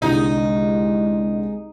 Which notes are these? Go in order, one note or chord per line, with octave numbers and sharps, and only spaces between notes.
C2 D3 G#3 D#4